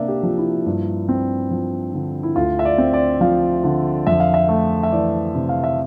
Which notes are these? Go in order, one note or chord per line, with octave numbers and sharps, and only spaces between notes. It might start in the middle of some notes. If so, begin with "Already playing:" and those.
Already playing: C3 A#3 D4 D5 E5
G4
F3
E4
G2
C4
F3
D3
E4
D2 F4
E5
D5
C4
D5
F3 F5
D3
F2 E5
F5
E5
A3
E5
E3 D5
C3
F5
E5